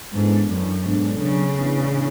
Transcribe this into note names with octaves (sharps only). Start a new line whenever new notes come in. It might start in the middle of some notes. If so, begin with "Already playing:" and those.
G#2 E3 B3 D4 A4
F#2
G#2 B2 F#3 B3 D4 A4
C#3
A2 E3 B3 D4